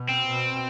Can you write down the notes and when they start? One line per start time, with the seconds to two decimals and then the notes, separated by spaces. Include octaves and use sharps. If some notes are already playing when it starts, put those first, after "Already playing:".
Already playing: B2
0.09 C4
0.31 B2